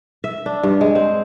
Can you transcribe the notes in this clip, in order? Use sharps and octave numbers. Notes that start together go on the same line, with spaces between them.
E5
D4
G2
G#3
C4